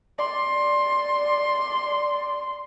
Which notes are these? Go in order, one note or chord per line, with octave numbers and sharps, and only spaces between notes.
D5 C6